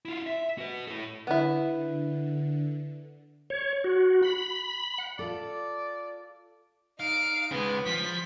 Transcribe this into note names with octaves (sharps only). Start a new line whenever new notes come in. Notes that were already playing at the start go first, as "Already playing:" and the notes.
E4 F4
E5
F#4 B4
E4 A4
D3 B3 E4
C#5
F#4
B5
F#5
F4 A4 D5
D#4 F5 D7
C#3 G#3 B3
F3 B6